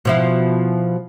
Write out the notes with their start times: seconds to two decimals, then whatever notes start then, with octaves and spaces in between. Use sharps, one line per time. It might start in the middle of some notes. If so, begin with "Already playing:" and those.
0.05 B2 F3 E4